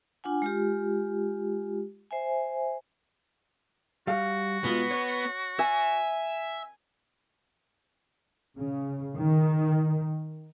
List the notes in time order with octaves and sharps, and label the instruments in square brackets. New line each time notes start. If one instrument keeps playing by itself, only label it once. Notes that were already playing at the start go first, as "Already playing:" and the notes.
[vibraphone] D4 F4 F#5 G#5
G#3 F4 G4
C5 E5 G#5
[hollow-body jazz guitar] G3 F5 [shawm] F#4
[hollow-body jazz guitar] B2 G#3 F4 [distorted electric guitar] B3
[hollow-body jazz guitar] C#5
[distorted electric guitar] E5 [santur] G#5
[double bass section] C#3
D#3